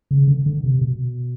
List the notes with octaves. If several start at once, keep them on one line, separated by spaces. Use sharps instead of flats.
C#3
D3
D3
C3
B2